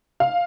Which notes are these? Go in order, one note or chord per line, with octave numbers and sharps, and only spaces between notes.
F5